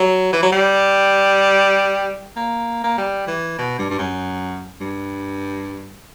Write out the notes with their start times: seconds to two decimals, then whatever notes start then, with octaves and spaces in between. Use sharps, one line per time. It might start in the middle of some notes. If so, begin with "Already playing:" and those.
Already playing: F#3
0.33 E3
0.43 F#3
0.52 G3
2.36 A#3
2.84 A#3
2.98 G3
3.27 E3
3.58 B2
3.79 G2
3.90 G2
3.99 F#2
4.81 G2